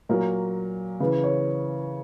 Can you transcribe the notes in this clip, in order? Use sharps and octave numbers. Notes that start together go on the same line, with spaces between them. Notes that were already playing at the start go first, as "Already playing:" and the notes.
A#2 F#3 A#4
C#3 E3 B4
C#5